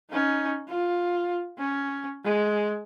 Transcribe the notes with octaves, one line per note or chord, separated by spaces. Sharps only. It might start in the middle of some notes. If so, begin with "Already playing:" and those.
C#4 D#4
F4
C#4
G#3